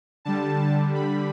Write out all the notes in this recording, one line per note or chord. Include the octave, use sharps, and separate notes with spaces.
D3 G3 A5
B5